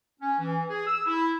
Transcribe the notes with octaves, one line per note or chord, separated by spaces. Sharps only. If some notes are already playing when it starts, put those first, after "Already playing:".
C#4
E3
G#4
E6
E4